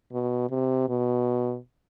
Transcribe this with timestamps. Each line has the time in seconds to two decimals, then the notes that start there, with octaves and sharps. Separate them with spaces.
0.12 B2
0.50 C3
0.89 B2